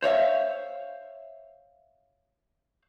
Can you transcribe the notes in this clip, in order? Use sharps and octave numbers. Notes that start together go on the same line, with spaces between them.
C5 C#5 E5 F5